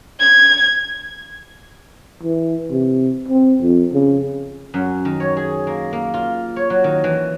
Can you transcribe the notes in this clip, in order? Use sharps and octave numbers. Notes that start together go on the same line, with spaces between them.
G#6
E3
C3
C4
F2
C#3
F#2
D#3
C#5
G#4
A#3
A#3
F4
C#5
F#3
D#3
E3